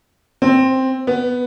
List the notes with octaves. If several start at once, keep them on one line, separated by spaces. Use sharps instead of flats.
C4
B3